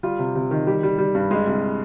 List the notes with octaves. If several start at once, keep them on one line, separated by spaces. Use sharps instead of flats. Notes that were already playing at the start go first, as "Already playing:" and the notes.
G3 F4
C3
C3
D#3
G3 G4
G3
G3
G2
G3 G#3 G#4
C2